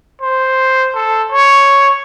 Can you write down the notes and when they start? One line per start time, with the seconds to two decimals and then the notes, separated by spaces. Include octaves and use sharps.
0.22 C5
0.95 A4
1.32 C#5